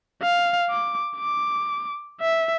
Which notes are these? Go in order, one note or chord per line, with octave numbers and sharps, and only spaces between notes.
F5
D6
D6
E5